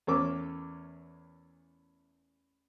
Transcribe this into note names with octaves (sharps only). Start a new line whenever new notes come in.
E2 A3 C#4 A4 A#4 D6